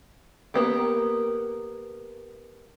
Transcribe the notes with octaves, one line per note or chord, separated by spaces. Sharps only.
A#3 B3 G4